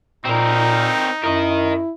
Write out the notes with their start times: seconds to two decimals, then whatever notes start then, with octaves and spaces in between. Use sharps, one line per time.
0.26 A#2 C4 D#4 A#4
1.24 F#2 E4 A#4 D#5